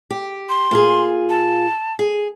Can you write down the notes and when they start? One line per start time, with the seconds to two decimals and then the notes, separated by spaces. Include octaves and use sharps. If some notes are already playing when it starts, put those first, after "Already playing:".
0.10 G4
0.49 C6
0.71 A#2 F4 G#4
1.30 A5
1.99 G#4